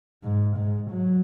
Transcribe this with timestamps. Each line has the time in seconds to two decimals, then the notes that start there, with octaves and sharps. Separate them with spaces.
0.23 G#2
0.56 G#2
0.90 F#3